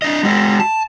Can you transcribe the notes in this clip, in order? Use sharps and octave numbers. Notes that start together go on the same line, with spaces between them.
D4 D#5
G#3 F#4
A5